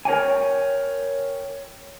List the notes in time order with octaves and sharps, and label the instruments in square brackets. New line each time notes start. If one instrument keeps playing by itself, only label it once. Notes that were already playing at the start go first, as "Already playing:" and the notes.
[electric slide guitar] A#4 C#5 G5 G#5